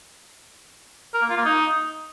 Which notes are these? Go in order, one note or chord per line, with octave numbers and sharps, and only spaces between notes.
A#4
A#3
F4
A#3
D#4